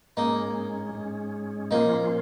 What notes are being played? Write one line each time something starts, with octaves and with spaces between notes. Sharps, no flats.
G#2 G#3 A#3 C#4 D#4
G#2 G#3 C#4
A#2 F3 A#3 C#4 D#4 F4